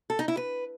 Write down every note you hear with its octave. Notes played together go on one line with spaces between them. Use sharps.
A4
D#4
E4
B4